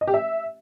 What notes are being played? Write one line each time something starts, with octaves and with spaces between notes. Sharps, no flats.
D#5
G4
E5